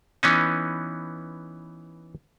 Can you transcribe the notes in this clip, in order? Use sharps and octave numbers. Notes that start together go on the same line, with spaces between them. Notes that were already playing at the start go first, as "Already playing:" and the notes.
E3 B3 C#4 D#4